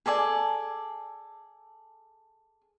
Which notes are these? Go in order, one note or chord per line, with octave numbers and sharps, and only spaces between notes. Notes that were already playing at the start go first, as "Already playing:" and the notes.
G#4 A4 D5 G#5